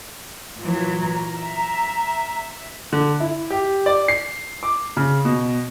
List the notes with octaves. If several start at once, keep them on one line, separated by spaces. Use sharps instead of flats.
A#2 E3 F#3
A#5
E5
D3
E4
G4
D5
C7
D6
C#3
B2